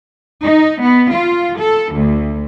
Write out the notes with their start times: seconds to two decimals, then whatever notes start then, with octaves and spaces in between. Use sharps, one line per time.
0.43 D#4
0.82 B3
1.13 F4
1.59 A4
1.94 D2